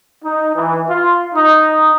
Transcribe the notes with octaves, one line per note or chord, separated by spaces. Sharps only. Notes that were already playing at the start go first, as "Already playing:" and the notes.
D#4
E3
F4
D#4